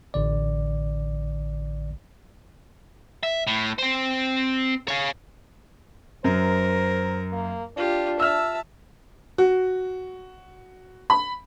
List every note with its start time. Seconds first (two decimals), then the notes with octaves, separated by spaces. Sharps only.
0.14 A1 D3 D5
3.23 E5
3.47 A2
3.78 C4 C5
4.88 C#5 F5
6.24 F#2 A#4 C5
7.33 A#3
7.77 D4 F4 G4
8.20 E5 A5 E6 F6
9.38 F#4
11.10 B5